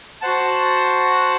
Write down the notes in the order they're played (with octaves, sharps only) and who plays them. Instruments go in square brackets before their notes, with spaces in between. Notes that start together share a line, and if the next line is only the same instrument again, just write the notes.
[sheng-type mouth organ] F#4 C5 F#5 A5